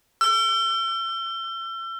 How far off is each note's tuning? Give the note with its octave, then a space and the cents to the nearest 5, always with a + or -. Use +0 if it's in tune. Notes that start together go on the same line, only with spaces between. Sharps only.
E6 +35